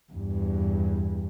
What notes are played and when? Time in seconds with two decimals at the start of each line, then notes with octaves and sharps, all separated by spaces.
0.12 E2 G2